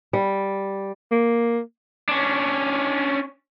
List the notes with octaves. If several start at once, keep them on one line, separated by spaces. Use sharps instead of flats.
G3
A#3
C#4 D4